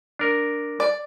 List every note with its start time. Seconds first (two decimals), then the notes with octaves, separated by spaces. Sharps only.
0.19 D4 A#4
0.80 D5